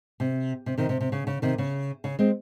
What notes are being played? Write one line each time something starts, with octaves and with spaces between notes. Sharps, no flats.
C3
C3
C3 D#3
C3
C3
C#3
C#3
C3 D#3
C#3
C#3
G#3 C4